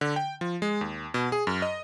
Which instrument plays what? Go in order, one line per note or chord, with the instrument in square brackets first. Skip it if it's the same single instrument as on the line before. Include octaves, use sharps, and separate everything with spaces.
[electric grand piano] D3
G5
F3
G#3
D#2
B2
G#4
F#2
D#5